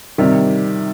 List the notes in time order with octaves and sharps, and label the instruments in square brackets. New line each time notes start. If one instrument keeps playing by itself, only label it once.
[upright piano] C3 D#3 G3